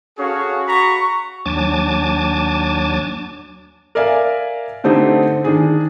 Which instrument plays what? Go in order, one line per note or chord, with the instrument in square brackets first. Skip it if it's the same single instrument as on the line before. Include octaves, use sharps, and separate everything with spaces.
[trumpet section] C#4 F#4 G#4 A4 C#5 F5
F#4 A#5 B5 C#6
[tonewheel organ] D#2 F#3 D4 G#5 A5 D6
[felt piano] A#4 D5 E5 F5 G#5
D3 A3 C4 D#4 G4
D#3 D4 G#4